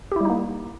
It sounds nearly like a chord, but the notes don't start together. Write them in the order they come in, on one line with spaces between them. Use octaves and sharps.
G4 E4 G3 D#4 A#3